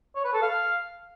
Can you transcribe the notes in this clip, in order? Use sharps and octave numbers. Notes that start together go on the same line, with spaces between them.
C#5
B4
A4
F5